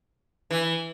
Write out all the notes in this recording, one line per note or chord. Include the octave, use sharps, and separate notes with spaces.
E3